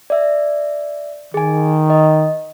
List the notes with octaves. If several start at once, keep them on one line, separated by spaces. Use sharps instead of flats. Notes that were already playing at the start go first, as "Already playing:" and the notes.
D5 E5
D#3 G#4 G#5
D#5